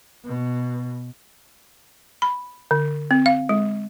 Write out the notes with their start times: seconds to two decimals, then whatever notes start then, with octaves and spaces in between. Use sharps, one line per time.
0.25 B2
2.22 B5
2.71 D3
3.11 C4
3.26 F5
3.49 G#3